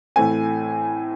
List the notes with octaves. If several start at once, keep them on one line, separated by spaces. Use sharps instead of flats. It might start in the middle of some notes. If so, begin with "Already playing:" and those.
A2 E3 A3 C4 G#5